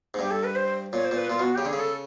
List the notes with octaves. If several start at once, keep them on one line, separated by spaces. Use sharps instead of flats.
G#2
G2 G4
A4
B4
C5
A#2 C#5
C5
A#2
B4
A#2 F4
B2 F#4
C#3 G4
D3 G#4
C#3
A4